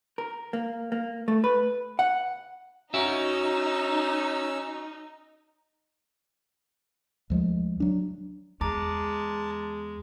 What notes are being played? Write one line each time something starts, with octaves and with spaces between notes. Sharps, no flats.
A#4
A#3
A#3
A3
B4
F#5
C#4 D#4 F#4 E5 E6
D2 F3 G#3
F#3 D4
E2 G#3 A5 A#5 D6